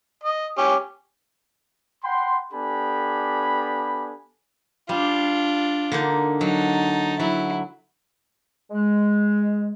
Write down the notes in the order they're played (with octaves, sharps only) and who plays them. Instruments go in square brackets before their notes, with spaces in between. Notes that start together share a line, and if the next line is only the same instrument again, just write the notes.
[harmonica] D#5
C#4 G4
[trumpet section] F#5 G5 B5 C6
B3 D4 G4 A4 G#5 B5
[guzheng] G3 [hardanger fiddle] D4 F4
[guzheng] D3 A#3 D#4
[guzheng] F#3 [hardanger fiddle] D#4 A5
[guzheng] F#3 [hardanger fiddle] E4
[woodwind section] G#3